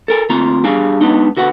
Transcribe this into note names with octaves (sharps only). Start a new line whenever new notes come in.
A4 A#4 G#5
D2 C4 F4 A#5
G3 D4 G#4 F5 G#5
G#3 B3 D4 D#4
D3 F#4 B4 F#5